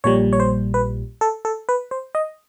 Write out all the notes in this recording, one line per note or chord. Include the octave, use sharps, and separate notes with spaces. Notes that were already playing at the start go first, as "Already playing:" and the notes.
A#1 A#2 G3 C#5
C#5
C5
B4
A4
A4
B4
C5
D#5